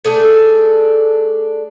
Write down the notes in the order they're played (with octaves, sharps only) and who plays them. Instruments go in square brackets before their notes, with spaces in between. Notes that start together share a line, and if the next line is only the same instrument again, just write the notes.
[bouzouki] A3 D4 G#4 A4